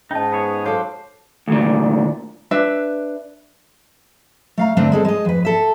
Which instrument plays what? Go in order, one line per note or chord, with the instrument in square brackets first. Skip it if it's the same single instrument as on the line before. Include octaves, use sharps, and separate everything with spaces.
[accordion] G#2 [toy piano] C#4 D#5 A5 [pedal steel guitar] D#4
[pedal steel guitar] B3 G#4 C#5
[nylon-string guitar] F#3 A4 [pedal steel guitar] C5 F5 D6
[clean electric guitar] D2 A#2
[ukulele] D4 B4 E5
[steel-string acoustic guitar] A3 F5 A#5
D3 A3 C4 D4 A#4
G#3 C4 A4
G#3 D#5
F2 B4
A4 E5